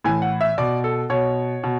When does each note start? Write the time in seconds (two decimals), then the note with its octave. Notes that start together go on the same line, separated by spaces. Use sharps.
0.04 A2 E3 G#5
0.22 F#5
0.41 E5
0.58 B2 D5
0.84 A4
1.10 B2 C#5
1.63 B2